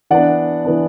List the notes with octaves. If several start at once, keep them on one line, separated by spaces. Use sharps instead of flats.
E3 B3 D4 D5 F#5
E3 B3 D4